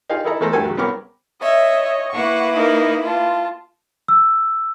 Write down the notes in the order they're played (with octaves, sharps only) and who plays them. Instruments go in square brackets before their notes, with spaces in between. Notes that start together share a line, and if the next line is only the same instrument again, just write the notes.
[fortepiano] D#4 F4 G4 G#4 F5
D#4 E4 G#4 A4 D#5 A#5
E2 A3 G#4 A4 C5 A#5
D2 G2 F#4 G4 A4 G#5
C#3 F#3
C2 B3 C#4 A#4 D6 F6
[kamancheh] C#5 D#5 [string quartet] E5
[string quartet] A#3 E4 B4 [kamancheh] F#5 C#6
[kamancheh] D#4 A#4
F4 A5
[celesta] E6